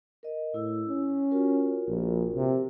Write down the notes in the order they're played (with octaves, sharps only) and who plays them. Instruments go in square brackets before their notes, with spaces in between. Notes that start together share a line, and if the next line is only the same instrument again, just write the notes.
[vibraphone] A#4 D#5
[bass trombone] A2 [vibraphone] E4 E6
[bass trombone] C#4
[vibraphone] F4 F#4 A#4
[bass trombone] A#1
C3